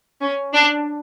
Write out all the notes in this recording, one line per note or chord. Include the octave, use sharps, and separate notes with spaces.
C#4
D4